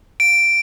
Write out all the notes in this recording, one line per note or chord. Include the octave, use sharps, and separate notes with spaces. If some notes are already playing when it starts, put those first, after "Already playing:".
D7